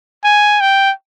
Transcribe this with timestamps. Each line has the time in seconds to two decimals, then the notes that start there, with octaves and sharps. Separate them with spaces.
0.24 G#5
0.61 G5